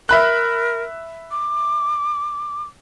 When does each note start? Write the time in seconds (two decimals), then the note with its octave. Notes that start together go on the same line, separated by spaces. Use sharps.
0.09 A#4 E5 B5 F#6
1.31 D6